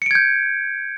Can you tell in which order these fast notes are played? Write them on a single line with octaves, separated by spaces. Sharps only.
C#7 D7 G#6 G6